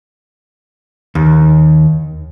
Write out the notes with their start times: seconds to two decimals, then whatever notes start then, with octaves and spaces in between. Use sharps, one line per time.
1.15 D#2